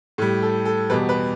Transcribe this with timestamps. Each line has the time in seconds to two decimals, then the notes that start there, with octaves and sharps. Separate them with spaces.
0.18 A2 G3
0.42 A4
0.65 A4
0.90 E2 B2 G3 B4
1.09 B4